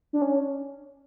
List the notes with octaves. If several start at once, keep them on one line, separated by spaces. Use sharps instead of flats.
D4
C#4